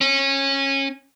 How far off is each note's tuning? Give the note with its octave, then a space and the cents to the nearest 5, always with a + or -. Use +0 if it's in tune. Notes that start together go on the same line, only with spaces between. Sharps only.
C#4 -20